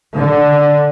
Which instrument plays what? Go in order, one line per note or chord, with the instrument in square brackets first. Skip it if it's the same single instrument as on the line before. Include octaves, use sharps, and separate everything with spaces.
[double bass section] D3